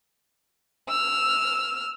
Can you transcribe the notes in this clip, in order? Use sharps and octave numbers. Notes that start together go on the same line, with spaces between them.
E6 F6